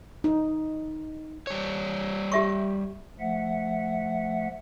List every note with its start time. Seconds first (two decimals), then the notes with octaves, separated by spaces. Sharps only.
0.24 D#4
1.47 G3 C#5
2.32 G4 E5 C#6
3.20 F3 A3 E5 F#5